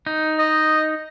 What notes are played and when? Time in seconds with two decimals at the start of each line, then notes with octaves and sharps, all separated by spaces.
0.06 D#4
0.39 D#5